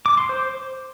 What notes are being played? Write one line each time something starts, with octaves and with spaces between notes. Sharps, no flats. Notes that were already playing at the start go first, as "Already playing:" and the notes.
D6
C6
C5